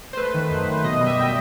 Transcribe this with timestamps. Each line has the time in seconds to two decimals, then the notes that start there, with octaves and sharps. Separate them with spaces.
0.13 C5
0.17 A3 B4
0.34 D#3
0.51 F#2 C5
0.68 F#2
0.84 B2 D#5
1.01 G3
1.06 E5
1.18 B2 G5